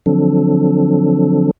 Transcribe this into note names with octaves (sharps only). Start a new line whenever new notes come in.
D3 F3 F#3 C4 D4 A4